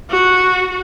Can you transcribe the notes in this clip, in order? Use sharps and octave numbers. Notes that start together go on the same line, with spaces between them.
F#4